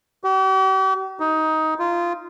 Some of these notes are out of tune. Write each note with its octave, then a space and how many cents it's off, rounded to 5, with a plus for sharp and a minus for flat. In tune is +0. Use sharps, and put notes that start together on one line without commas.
G4 -45
D#4 +15
F4 -15